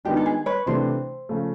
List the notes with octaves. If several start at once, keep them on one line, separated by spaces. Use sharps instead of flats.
D#3 G#3 B3 D4 G4
A4
G#4
B4 C#5
C3 E3 A3 D4 C5
C#3 F3 A3